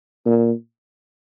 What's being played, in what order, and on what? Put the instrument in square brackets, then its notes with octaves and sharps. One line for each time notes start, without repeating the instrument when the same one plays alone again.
[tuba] A#2